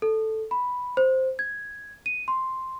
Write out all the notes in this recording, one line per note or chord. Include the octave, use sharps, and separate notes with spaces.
A4
B5
C5
G#6
D#7
C6